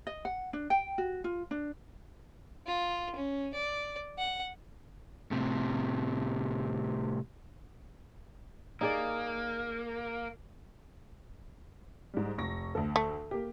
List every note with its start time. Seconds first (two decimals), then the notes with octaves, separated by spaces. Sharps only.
0.07 D#5
0.25 F#5
0.53 D4
0.70 G5
0.98 F#4
1.24 F4
1.51 D4
2.66 F4
3.16 C#4
3.54 D5
4.18 F#5
5.31 A2 C3
8.81 A#3 D#4 G#4 D5
12.14 G#2 G3
12.38 F1 C#6 A#6
12.75 D2 A4
12.96 A3
13.31 A#3 G4